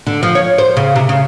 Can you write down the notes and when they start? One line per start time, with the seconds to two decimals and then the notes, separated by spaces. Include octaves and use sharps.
0.07 D3
0.23 F3
0.35 C#5
0.58 C5
0.77 C#3
0.96 C3
1.09 C#3